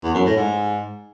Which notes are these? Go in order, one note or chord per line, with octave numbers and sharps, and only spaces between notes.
E2
F#2
A2
G#2